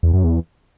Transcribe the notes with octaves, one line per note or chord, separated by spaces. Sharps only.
E2
F#2
E2